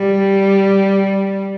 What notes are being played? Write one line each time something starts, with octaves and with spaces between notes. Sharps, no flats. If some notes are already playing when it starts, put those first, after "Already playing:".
Already playing: G3